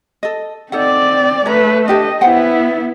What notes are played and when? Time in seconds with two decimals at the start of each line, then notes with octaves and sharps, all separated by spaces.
0.23 A4 D#5
0.72 C4 D#4 A4 D5 F#5
1.46 A3 B4 C#5 A#5
1.88 D4 G4 A4 D#5
2.21 B3 E4 C5 F#5 G5